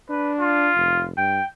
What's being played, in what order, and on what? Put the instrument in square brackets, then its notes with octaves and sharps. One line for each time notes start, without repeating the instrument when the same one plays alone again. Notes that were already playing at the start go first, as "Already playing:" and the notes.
[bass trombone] D4 [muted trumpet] B4
[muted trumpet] F4
[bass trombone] F1
[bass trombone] G2 [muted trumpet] G5